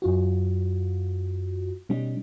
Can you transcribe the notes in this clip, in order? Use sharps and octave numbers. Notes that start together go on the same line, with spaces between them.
F#2 F4 F#4
B2 G3 C#4 D#4